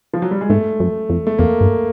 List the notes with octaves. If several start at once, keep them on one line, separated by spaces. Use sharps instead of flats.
F3
F#3
G3
G#3
G#2 A3
F#2
F2
A3
F2 A#3
G2